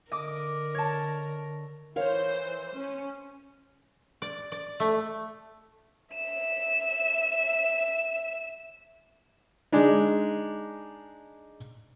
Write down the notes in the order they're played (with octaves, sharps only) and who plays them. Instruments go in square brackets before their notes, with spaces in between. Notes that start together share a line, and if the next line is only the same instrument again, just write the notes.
[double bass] D3 [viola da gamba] A#4 [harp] D#5 D6
[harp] C#5 A5
[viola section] E3 C5 [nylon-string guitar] A#4 C#5 F5
[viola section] C#4
[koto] D5
D5
A3
[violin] E5 E7
[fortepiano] G#3 D4 D#4